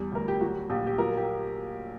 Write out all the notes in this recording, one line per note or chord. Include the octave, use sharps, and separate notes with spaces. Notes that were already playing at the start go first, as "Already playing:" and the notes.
Already playing: E2 G3
D2 A#4
G4
F#3 F#4
A#1 G4
G4
F#3 A#4
G4